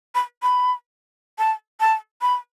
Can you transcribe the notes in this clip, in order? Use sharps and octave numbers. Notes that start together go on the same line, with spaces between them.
B5
B5
A5
A5
B5